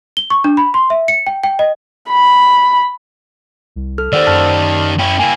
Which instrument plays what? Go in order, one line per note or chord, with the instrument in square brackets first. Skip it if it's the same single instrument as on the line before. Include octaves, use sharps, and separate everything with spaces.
[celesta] G7
C#6
D4
B5
C6
E5
C#7
G5
G5
D#5
[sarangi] B5
[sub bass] C2
[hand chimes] A4 [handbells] F6
[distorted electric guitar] D#3 G4 [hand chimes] C5 F#5 E6 [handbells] D5
[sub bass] F#2 [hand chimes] A5 F6
[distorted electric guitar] C#4 E4 [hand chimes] G5
[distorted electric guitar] A#3 E4 [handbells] G#5